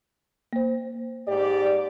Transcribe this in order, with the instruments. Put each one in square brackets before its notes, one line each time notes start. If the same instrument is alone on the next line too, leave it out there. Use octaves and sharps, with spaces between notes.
[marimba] A#3 C5
[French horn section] G#2 G4 D5